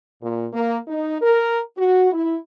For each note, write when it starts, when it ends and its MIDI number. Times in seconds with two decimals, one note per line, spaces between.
0.22 0.47 46
0.53 0.78 58
0.88 1.17 63
1.22 1.61 70
1.78 2.08 66
2.12 2.36 64